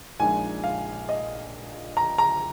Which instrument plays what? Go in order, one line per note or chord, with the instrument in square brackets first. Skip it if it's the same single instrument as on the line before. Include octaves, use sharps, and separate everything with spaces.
[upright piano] A#1 A#2 G#3 D#4 G#5
F5
D#5
A#5
A#5